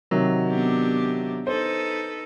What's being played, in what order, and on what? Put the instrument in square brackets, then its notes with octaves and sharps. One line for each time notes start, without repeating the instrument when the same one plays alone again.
[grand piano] C3 D#3 F#3
[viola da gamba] B3 D4 G4
[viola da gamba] D#4 A4 B4 [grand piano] C5